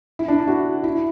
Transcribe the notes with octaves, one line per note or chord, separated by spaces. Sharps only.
E4
D4
E4
F#4
E4